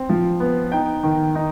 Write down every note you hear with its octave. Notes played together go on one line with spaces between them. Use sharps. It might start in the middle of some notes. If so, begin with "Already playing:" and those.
Already playing: C4
F3
B3
D#4 G5
D#3
D#4